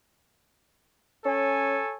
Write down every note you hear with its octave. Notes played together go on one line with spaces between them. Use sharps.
C#4 A4 C#5 G#5